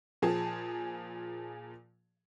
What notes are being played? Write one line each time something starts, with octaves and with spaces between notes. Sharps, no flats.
A#2 F3 G#4 A5